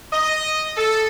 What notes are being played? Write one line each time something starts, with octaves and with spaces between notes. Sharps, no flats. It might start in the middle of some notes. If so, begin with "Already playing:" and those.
D#5
A4